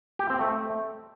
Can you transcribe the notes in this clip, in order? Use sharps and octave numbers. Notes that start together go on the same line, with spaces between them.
G4
C4
A3